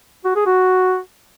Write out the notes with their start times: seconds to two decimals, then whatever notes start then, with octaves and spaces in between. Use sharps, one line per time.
0.25 F#4
0.35 G#4
0.46 F#4